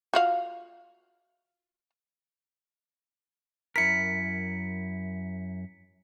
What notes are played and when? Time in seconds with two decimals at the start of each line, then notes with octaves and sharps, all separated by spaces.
0.14 F4 F#4 F5
3.76 F#2 E4 A#4 B6 C#7